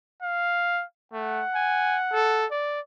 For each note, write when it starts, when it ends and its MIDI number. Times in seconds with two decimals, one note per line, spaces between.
0.23 0.84 77
1.13 1.43 57
1.13 2.49 78
1.55 1.99 80
2.13 2.46 69
2.51 2.80 74